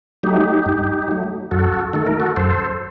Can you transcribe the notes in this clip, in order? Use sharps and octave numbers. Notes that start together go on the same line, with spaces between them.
F#3 A3 D#4 G4
G2
F#3 A3
F#2 F#4 A4
D#3 A3 A4
A#4
F#4 A4
F#2 A4 C5